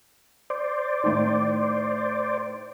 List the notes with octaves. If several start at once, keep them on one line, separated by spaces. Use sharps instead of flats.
C5 D5
A2 D#3